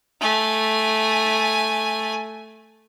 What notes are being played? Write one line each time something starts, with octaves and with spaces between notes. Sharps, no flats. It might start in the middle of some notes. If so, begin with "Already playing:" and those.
A3 G#5